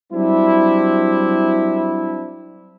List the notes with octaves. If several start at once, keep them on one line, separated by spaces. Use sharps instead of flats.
F#3 G3 C4 D4 E4